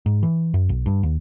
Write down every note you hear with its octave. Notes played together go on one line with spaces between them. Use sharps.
G#2
E3
F#2
B1
G2
D#2